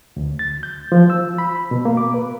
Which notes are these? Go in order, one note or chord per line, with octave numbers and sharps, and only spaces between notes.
D2
A6
G6
F3
E6
B5
B2
A#3
D6
B4